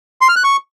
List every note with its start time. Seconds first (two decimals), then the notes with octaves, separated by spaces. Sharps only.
0.21 C6
0.29 F6
0.36 F#6
0.44 C#6